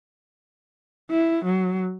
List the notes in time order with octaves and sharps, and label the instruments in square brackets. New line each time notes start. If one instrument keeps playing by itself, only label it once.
[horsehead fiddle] E4
F#3